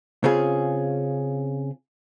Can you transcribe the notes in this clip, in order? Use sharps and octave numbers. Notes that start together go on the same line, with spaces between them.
C#3 C4 C#4 F4 G#4